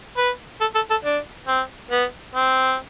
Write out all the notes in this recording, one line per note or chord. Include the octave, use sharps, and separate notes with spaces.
B4
A4
A4
A4
D4
C4
B3
C4